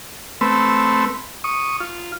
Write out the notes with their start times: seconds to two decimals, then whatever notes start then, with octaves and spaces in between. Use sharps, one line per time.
0.41 A3 C4 B4 E6
1.44 C#6 D#6
1.80 F4